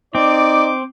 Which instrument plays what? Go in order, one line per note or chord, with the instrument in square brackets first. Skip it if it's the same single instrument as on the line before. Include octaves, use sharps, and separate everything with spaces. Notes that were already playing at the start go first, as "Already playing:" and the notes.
[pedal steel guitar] C4 [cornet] D#4 [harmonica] D5 [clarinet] D6